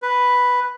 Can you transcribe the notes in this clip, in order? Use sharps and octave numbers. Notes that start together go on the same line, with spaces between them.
B4